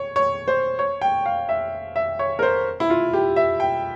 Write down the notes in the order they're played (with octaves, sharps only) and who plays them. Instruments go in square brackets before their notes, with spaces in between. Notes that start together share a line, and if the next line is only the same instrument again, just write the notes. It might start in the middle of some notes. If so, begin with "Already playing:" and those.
Already playing: [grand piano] C#5
C#5
C5
C#5
G5
F5
E5
E5
C#5
A#4
C5
E4
F4
G4
E5
G5